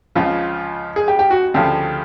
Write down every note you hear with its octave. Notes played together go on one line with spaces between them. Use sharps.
C#2 C#3 F3 F4
G#4
G4
G4
F#4
D2 C#3 F3 G4